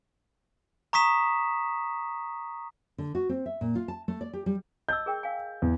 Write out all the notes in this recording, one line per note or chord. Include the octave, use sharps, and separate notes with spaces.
A#5 C#6 D#6 B6 E7
D3
F#4
C4
E5
A#2
F4
A5
A3
D5
G4
G3
D#5 A5 E6 G6
G#4 A#4 G5
F5 G#5
E2